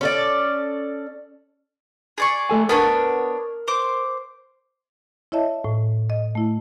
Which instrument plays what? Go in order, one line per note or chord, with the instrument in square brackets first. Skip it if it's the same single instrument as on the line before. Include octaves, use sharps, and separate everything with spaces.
[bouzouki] C#4 A4 D5
[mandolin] G#4 D5 C#6
[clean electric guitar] A3 A4 G#5
[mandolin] B3 D4 C#5 [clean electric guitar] A#4
[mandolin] C5 D6
[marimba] E4 C#5 D#5 E5 A5
A2
D#5
A3 E4